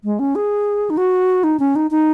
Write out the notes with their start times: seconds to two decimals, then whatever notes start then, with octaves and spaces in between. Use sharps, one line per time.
0.04 G#3
0.19 C#4
0.35 G#4
0.90 D#4
0.97 F#4
1.44 D#4
1.60 C#4
1.76 D#4
1.91 D#4